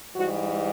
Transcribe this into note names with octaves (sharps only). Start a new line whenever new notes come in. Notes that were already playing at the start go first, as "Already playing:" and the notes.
G#2 E3 G3 F#4